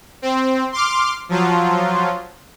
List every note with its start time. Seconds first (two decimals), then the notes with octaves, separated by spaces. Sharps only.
0.22 C4
0.72 C6 D6 F6
1.29 F3 F#3 F4